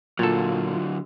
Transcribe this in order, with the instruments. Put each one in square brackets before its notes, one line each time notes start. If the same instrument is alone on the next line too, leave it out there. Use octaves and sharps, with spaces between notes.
[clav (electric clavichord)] A#2 A4 [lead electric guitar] D3 F#3 [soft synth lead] F4